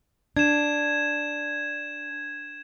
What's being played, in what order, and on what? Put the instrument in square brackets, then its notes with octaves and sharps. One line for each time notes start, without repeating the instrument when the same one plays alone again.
[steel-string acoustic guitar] D4 [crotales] G#6 E7